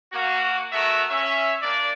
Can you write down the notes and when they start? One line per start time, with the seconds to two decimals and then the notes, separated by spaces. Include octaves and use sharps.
0.13 A#3 F#4
0.72 A3 B3 F#4 A#4 E5
1.10 C#4 E5
1.62 A#3 D4 D5